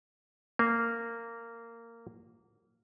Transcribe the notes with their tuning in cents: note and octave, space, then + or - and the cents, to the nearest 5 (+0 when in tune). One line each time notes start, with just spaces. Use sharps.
A#3 -15